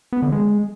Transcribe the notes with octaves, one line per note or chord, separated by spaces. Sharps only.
B3
D3
G#3